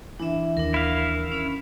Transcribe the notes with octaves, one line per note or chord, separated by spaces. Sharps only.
E3 D4 E5
D#2 D4 A#4
E4 F5
C#4 B5